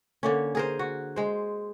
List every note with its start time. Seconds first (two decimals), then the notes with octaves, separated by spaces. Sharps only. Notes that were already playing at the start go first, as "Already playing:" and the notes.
0.23 D3 A#3 C#4
0.55 G#4 A#4 C5
0.79 F#4
1.16 G#3 C5